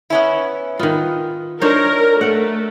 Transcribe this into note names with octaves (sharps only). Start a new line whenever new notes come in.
B3 C#4 E4
D#3 B3 F4
D4 D#4 A#4 C5 C#5
A3 A#4 F#5